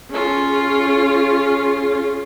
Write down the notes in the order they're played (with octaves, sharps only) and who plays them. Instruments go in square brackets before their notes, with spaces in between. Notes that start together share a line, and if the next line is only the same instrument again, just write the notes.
[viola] C#4 F4 [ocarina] G#4